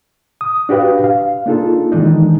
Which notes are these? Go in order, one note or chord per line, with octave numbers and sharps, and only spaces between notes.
D#6
D4 F#4 G4 B4 F5
F5
A#3 D4 D#4 F4 G#4 A4
D#3 E3 G#3 D4 D#4